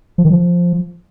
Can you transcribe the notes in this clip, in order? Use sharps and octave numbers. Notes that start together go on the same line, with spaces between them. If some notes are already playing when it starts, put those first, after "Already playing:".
F3
D#3
F3